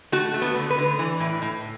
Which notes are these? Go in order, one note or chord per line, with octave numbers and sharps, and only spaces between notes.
A3 F#4
A3
B3
D3
B4
D3
E3
A2
A2